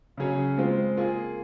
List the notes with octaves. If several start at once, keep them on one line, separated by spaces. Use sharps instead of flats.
C#3 F#3 C#4 G#4 C#5
G#3 C4 F4
A#3 F4 G#4